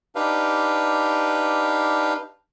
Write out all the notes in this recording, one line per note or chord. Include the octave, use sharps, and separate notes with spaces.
D4 D#4 G4 B4 F5